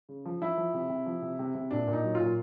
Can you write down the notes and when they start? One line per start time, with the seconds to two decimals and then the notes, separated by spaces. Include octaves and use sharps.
0.09 C#3
0.25 F3
0.42 F3 E4
0.57 F3
0.74 C3
0.90 C3
1.06 F3
1.22 C3
1.39 C3
1.55 C3
1.71 A#2 D4
1.88 A#2
1.93 D#4
2.04 F#3
2.15 F4
2.20 A#2